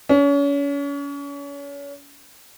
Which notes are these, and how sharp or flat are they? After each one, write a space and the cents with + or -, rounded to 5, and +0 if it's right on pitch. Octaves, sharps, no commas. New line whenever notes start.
C#4 +35